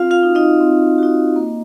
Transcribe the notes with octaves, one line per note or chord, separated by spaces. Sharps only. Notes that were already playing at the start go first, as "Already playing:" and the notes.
Already playing: C4 F4 F5
F4 F5
D#4 F#4
D#4 D#5
C4
D#4 F#4
A#3